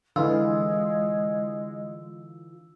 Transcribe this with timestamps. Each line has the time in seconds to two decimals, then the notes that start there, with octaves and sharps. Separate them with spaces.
0.16 D3 E3 G#3 F4 E6